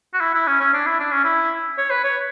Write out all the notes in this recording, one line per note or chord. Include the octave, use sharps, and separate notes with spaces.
F#4
E4
E4
C#4
C#4
D4
E4
D4
C#4
E4
C#5
B4
C#5